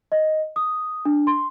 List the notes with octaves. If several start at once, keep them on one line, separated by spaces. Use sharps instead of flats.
D#5
D#6
D4
C6